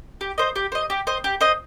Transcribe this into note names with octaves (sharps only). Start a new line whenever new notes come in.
G4
C5 D#5
G4
C5 D#5
G4
C5 D#5
G4
C5 D#5